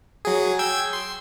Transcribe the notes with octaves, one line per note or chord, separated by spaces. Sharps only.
F#3 G#4
G5 E6 G#6
C6